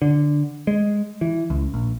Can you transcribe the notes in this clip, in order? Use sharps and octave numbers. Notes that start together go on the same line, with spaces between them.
D3
G#3
E3
C#2
A#1